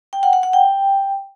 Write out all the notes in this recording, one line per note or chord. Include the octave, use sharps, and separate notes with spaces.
G5
F#5
F#5
F#5
G5